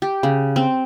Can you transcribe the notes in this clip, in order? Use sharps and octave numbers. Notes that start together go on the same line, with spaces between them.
G4
C#3
C4